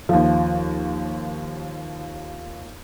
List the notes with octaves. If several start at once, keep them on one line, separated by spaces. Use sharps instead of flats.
D#2 F3